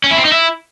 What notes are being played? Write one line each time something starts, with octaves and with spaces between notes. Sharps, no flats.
C#4
E4
C4
D#4
E4